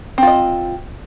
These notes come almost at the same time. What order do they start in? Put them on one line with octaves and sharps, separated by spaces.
C4 F4 D#5